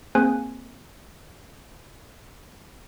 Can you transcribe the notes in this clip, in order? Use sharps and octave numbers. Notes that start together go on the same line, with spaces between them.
A#3 C4 G#4 C5 G#5 F#6